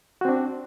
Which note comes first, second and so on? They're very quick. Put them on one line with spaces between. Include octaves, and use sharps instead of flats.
F#4 C4 D4